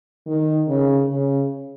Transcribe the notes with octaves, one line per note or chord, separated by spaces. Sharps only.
D#3
C#3
C#3